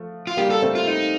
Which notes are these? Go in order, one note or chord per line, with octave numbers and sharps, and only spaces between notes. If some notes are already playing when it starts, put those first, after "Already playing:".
Already playing: F3 A3
F4
G3 A#3 G4
A4
A3 C4
F4
D#4